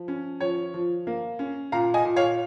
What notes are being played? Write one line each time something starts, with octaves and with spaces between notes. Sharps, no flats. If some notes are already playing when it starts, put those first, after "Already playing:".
Already playing: F3
C#4
F3 C#5
F3
A#3
C#4
A#2 F5 A#5
D#5 G#5
A#2
C#5 F5